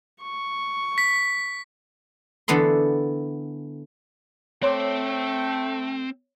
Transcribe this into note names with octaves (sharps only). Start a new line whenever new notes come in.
C#6
B6
D3 E3 B3 A4 C6
A3 C4 C#5 G5 C6 D6